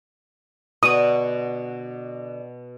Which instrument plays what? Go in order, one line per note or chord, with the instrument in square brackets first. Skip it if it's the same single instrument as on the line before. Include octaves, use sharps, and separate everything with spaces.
[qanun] B2 [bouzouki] D3 F#4 [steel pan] D#6